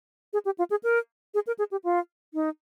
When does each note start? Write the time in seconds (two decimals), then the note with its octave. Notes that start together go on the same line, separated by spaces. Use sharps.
0.33 G#4
0.45 G4
0.58 F4
0.70 G#4
0.83 A#4
1.34 G#4
1.47 A#4
1.59 G#4
1.71 G4
1.84 F4
2.34 D#4